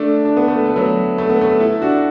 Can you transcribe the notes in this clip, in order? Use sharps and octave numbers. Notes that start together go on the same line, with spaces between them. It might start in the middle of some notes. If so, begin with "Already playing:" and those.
Already playing: A3 D4
D4
B3
A3
A3
F#3 B3
A3
B3
A3
E4 A4
D4 F#4